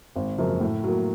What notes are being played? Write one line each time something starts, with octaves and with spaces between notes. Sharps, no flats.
G#1
F#2 C#3 F3 A#3
A2
F#3 A#3